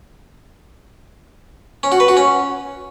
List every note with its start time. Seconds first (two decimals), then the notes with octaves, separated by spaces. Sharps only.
1.83 C#4
1.92 F#4
2.00 B4
2.08 F#4
2.17 C#4